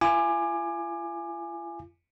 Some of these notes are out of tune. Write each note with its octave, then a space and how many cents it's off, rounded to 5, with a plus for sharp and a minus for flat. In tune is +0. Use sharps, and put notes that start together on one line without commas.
F4 -45 G#5 +0 D6 +25